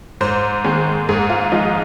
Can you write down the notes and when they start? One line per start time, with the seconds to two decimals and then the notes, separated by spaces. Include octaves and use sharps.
0.21 G#2 C5
0.64 D#3 G#3
1.09 G#2 G#4
1.30 F4
1.51 F3 G#3 D#4